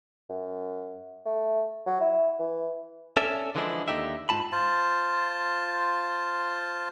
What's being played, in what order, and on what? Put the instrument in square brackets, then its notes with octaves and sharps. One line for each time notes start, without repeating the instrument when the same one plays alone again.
[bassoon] F#2
A3
F#3
E4
E3
[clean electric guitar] C#4 A4 D5 E5
D3 E3 F3 G#3 D4 E4
D#2 B2 D3 D#4 G4 E5
G#2 C#4 F4 A5 B5
[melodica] F4 C5 A5